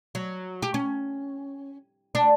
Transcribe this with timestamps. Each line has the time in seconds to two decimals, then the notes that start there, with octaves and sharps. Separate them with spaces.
0.15 F#3
0.62 G4
0.74 C#4
2.15 D4